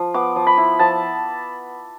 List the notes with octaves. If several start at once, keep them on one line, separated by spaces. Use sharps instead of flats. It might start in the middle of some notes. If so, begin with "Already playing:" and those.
Already playing: F3
B3 D6
F3
B5
E4
F3 A5